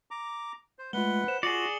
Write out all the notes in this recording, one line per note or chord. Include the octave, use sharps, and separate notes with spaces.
A#5 D6
C5
G#3 A3 F4 B4 F#5 G7
C5 E7
F4 F#4 G#4 D5 C#7 F#7